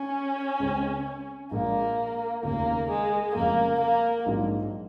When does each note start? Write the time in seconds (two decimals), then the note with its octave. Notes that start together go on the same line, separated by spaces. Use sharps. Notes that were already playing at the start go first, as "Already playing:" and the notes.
Already playing: C#4
0.60 C#2 C#3 G#3 C4
1.51 A#1 A#2 G#3 A#3
2.43 F1 D#2 C#3 A#3
2.89 G#3
3.34 F1 F2 C#3 G#3 A#3
3.80 A#3
4.26 A#1 G#2 F#3